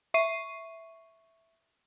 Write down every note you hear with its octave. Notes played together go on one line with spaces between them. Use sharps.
E5 C#6 C7 D#7